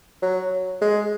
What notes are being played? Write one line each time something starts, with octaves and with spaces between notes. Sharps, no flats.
F#3
G#3